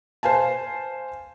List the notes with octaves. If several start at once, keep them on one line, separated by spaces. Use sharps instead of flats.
C5 F5 G#5 A5